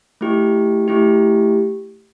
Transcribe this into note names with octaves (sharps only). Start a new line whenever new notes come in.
A3 E4 G4
A3 E4 G4